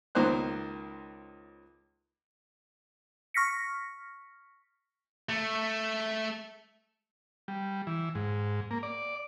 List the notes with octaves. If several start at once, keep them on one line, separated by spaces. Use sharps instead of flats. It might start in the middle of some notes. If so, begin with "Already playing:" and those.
C#2 D#3 A#3 C5 F#6
C#6 F6 A#6 B6 C#7
A3
G3
E3
G#2
A#3
D5